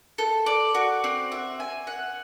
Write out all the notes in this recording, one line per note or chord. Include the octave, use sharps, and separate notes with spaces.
A4
D5
F#4
C4
E5
G#5
F#5